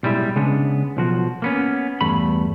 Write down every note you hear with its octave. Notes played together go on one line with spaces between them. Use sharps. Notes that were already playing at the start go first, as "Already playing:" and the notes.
B1 G3 G#3 E4 E5
C#3 G#3 B3 D4
B1 F3 F#4
A#3 B3 C#4
E2 G2 A3 B5